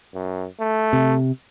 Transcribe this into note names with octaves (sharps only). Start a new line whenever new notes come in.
F#2
A3
C3